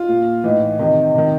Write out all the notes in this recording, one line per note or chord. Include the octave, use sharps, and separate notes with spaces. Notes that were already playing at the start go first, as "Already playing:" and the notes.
Already playing: F4
A#2
A2 E3 D#4
C3 D#3 D#4
C3 D#3